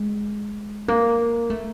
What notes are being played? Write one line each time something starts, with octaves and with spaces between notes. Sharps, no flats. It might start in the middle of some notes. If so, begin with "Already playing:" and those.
Already playing: G#3
A#3
A3